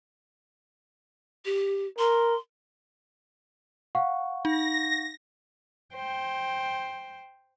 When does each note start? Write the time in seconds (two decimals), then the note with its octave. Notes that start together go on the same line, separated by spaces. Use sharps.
1.45 G4
1.99 A#4 C6
3.95 F5 F#5 C#6
4.45 D#4 A#6
5.95 C5 G5